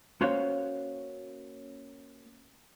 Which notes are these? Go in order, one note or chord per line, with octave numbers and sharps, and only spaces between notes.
A#3 C#4 F#4 C5 C#5 F5